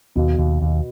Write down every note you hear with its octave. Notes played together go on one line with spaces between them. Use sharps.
D#2 B2
D#2
D#2